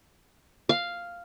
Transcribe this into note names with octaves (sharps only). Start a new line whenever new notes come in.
F5